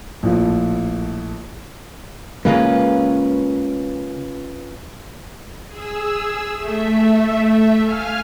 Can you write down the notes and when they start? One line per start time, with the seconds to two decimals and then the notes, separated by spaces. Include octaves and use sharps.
0.23 A#1 A2 F3
2.45 C#3 G#3 A#3 C#4 F4 B4
5.66 G#4 E6
6.55 A3 E5
7.83 F5 G#5 F6